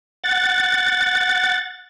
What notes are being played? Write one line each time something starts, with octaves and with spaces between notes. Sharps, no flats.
F#5 A6